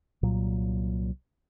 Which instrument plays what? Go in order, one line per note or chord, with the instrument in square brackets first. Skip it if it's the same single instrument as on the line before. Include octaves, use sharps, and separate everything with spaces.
[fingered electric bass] C2 A#2 F#3